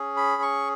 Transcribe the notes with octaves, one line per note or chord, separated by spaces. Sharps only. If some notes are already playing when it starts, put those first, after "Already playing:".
Already playing: C#4 G#4
B5
C#6